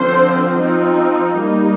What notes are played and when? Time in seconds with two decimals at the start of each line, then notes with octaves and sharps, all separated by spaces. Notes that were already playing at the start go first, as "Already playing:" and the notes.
Already playing: D3 F3 C4 C5
0.59 F3 C4 D#4
1.40 G3 A#3 D#4